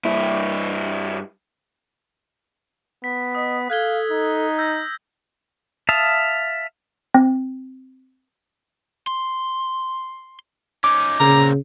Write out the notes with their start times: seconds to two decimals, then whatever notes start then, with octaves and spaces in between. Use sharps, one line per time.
0.05 G2 E4
3.04 B3 B6
3.35 D#5 D#6 B6
3.70 A4 F5 F#6 G#6 G7
4.12 D#4
4.58 E6 G6 A#6
5.89 E5 F5 A5 D#6
7.14 C4
9.07 C6
10.84 C#4 D#4 D6
11.20 A#2 C#3 C4 A#5